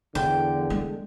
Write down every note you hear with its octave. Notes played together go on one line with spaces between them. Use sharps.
E2 D3 E3 G5
G#3